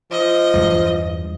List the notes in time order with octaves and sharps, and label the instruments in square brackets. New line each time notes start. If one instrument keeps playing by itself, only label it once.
[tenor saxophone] F3 [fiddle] D#5
[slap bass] E2 G2 F#3